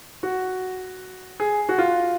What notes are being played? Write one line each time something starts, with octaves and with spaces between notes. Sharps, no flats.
F#4
G#4
F#4
F4